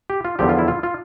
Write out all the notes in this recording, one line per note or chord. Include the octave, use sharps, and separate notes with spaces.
G4
F4
E2 D3 F3 G4
F4
E4
F4
F4